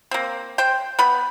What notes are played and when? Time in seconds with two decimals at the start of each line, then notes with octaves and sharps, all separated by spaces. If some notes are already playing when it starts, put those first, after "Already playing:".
0.11 A#3 C4
0.58 C5 G5
0.99 B3 B5